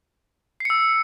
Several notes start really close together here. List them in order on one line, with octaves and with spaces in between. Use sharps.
C7 C#7 E6